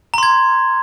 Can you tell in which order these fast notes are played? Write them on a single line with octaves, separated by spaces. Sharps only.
A#5 C6 G#6